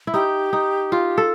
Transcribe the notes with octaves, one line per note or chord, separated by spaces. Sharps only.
E4
D#4 G4
D#4
F4
A4